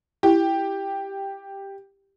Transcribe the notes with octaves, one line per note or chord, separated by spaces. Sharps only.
E4 G4